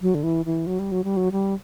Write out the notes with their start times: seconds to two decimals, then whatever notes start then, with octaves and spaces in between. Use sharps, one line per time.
0.02 F#3
0.15 D3
0.23 E3
0.46 E3
0.67 F#3
0.79 G3
0.92 F#3
1.04 G3
1.17 F#3
1.32 G3